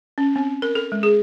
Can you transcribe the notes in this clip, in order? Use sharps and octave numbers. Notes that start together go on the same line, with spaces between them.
C#4
C4
A#4
A4
G#3
G#4